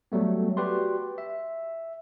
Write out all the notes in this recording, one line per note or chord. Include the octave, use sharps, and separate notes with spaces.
F#3 G3 A3 B3
F#4 G4 B4 D5 C6
E5